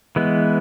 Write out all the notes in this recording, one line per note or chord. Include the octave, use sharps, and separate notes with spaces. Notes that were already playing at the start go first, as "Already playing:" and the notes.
E3 G#3 B3